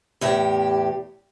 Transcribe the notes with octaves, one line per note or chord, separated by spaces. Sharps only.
E2 A2 G4